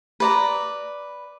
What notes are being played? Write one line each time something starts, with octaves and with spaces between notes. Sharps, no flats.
B4 D5 A#5